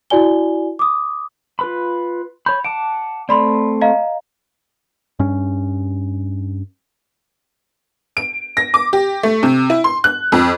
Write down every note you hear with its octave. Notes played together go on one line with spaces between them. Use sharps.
E4 F#4 D5 G#5 G7
D6 D#6
F4 B4 B5
C#5 B5 G6
F#5 A5 D6 D7
A3 C4 D5 B5 C6
D#5 F5 A#5
G2 C#4
D7
A#6
D6
G4
A3
C3
E4
C6
F#6
F2